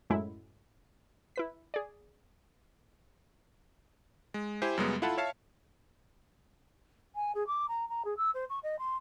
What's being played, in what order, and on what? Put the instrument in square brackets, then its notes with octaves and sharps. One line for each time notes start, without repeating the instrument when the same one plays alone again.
[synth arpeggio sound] F#2 A2 F#3 G#3 E4
E4 B4 B6
G#4 D5
[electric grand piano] G#3
E4 G4 C5 G#5
F#2 C#3 G3 G#3 B3
E4 F4 A4 F#5 A5 B5
C#5 E5 F5 A5
[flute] G#5
G#4
D6
A#5
A#5
G#4
E6
C5
C#6
D#5
C6